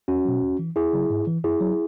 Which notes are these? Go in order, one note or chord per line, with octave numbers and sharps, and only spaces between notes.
E2 C#4 F#4
B2 F#3
E2
E3
E2 E4 G#4
C#3 F#3
G#2
E3
F#2 E4 G#4
F#3